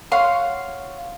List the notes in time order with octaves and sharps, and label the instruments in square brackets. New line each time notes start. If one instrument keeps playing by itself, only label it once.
[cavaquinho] C#5 F5 F#5 C6